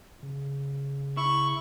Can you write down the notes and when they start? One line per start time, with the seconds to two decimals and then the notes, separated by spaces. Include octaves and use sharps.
0.23 C#3
1.17 E4 C#6